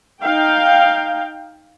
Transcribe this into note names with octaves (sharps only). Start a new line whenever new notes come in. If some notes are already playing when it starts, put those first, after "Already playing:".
D#4 F5 G5